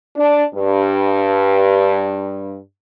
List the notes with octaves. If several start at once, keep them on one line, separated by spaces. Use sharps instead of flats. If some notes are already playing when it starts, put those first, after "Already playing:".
D4
G2